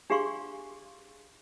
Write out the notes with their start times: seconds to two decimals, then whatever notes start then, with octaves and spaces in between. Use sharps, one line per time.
0.10 D4 G4 G#4 F5 C6 C#6